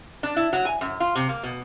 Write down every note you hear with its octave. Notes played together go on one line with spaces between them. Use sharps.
D4
E4
F#3
G#5
F#2
F4
C3
A#3
B2